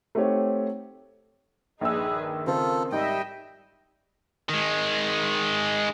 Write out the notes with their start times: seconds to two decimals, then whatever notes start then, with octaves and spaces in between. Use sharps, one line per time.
0.15 A3 C4 D#4 G4 C#5 F#5
1.81 A#1 G2 D#4 G#4 B4 E6
2.15 D#3
2.47 C#3 C4 F4 A4 A#4
2.92 G#2 G3 D#5 E5 G5
4.49 D#3 G#3